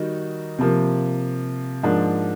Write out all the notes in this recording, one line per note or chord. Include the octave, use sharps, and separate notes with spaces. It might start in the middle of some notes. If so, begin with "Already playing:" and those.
Already playing: D#3 G3 D#4 F#4
C3 F3 A#3
G#2 F3 A#3 D4